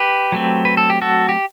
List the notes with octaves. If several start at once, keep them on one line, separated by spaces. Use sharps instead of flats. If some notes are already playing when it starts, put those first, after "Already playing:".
Already playing: G4 B4
F#3 A3 C4
B4
A4
G4
F#4 A4
G4